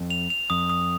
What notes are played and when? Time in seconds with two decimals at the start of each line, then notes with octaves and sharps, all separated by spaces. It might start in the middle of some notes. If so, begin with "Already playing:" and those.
Already playing: F2
0.10 F7
0.30 F7
0.50 F2 D#6
0.70 D#6